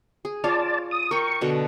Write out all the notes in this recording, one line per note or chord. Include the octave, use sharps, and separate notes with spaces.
G#4
F4 C#5 D5 F5 A5
D#6
A#4 G5 C#6
B2 D3 A4